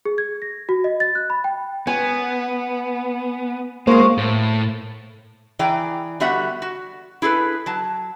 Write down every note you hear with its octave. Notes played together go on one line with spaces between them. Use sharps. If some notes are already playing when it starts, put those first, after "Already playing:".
G#4
G#6
A#6
F#4
D#5
A6
F#6
B5
G5
B3 G#5
G#3 A#3 F#4 C5 F5
A2
E3 G#4 D5 G5 A#5
D3 G3 B3 F#4 E5 F#5
F#4
E4 G#4 A4 B4
F#3 A5